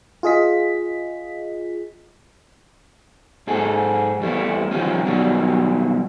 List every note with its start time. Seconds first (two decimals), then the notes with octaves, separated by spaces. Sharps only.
0.23 F4 G#4 D#5 B6
3.47 G#2 G#4 A4
4.20 E2 G3 A3 E4
4.71 C3 D#3 F3 G3 C#4
5.05 B2 D#3 F#3 G3